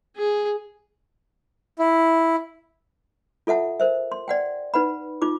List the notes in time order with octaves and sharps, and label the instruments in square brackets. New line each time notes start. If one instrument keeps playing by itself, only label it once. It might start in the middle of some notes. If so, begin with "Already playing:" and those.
[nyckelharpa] G#4
[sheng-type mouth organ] E4
[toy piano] F4 A4 E5 F#5 A5
A#4 C5 E5
C6
D5 F#5 G5
D#4 B4 F#5 B5
D#4 F4 D6